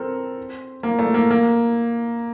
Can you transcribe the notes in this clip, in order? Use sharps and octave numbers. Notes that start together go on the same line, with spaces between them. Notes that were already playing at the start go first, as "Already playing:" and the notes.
Already playing: C4 A4 A#4
A#3
A3
A#3
A#3